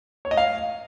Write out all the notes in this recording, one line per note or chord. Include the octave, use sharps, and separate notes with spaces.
C#5
D#5
F5